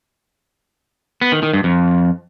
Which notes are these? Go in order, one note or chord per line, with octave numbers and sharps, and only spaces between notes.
B3
D#3
D#3
G2
F2